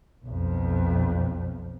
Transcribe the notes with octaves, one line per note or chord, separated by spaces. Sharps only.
B1 F2